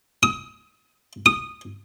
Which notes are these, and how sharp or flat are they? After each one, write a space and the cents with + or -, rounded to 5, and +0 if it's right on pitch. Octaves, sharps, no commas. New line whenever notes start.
D#6 +35
D#6 -10